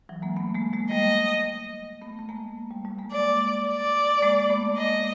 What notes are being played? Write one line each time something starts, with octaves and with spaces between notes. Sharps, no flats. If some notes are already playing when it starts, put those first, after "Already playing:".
E3 F#3
G#3 A#3
A3 B3
G#3 A#3
G#3 A#3
G3 A3 D#5
A3 B3
A3
G#3 A#3
G3 A3
G3 A3
G#3 A#3
G#3 A#3 D5
D5
G#3 A#3
A3 B3
G#3 A#3 D#5